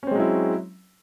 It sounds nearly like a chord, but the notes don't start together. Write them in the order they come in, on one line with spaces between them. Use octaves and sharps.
C#4 C4 G#3 F#3 E4